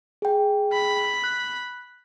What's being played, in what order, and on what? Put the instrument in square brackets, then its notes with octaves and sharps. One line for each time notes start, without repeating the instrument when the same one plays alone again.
[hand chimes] G#4 G5
[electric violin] B5
[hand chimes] F#6